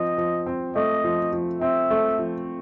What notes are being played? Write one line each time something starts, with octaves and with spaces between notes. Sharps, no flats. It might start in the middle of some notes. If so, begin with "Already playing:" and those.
Already playing: F3 C4 D#5
F3
C4
A3 D#5
F3
F3
C4 E5
A3
F3